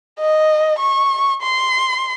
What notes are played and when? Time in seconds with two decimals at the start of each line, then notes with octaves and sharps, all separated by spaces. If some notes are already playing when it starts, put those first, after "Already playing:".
0.19 D#5
0.79 C#6
1.42 C6